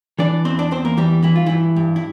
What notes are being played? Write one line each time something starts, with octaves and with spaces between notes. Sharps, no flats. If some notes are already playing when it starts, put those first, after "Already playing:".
E3 D4 D5
E2 C4 C5
D4 D5
E2 C4 C5
A#3 A#4
E3 G3 G4
E3 E4
F4
G2 E3 E4
G2
E4